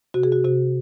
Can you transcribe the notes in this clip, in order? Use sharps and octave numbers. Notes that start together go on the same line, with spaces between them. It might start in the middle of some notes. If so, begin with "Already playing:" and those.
C3 F#4
G#4
F#4
C3 F#4